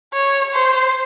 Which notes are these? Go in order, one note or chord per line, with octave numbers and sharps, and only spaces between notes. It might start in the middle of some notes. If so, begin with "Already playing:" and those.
C#5
C5